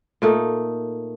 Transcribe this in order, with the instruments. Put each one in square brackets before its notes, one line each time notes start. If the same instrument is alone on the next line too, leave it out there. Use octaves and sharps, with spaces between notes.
[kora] A#2 A3 D#4